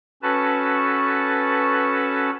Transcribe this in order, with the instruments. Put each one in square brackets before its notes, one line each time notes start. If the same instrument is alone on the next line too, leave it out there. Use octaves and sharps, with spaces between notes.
[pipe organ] C#4 F#4 A4 B4 A5